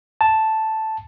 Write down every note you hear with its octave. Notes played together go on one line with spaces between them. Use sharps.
A5